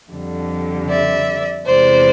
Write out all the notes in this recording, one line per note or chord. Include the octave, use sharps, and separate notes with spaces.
F2 D3 G3
D5 E5
E2 C3 E3 G#3 C5 D5